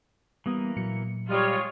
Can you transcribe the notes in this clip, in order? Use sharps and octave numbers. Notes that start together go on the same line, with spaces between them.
E3 G3 A#3 B3 D#6
A#2 F#3 C#7
G3 G#3 F4 C#5 D#5